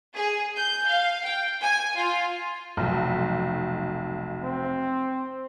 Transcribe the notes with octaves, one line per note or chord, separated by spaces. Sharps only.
G#4
G6
F5
G5
G#5
F4
F1 B1
C4